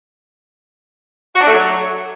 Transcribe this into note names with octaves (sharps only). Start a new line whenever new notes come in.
F#4
D4
A3
F#3